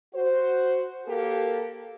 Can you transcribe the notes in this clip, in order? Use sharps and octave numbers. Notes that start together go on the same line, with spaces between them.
F#4 C5
A#3 G4 A4 A#4